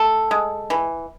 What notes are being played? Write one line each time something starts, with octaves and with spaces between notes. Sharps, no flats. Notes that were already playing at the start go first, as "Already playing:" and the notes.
Already playing: A3 A4
G#3
E3